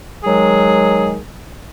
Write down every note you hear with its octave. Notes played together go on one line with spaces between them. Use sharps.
D#3 F#3 G#3 G#4